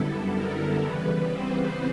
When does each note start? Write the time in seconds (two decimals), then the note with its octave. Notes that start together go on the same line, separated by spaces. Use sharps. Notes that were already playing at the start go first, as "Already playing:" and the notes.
Already playing: F#2 D3 G3 B3 E4 A4
0.34 A#4
0.82 C#3 E3 G3 B3 B4
1.30 C4 C5